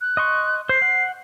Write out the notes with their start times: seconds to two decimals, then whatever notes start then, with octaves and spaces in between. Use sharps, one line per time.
0.01 F#6
0.17 D#5 C6 C#6
0.69 C5 C7
0.82 F#5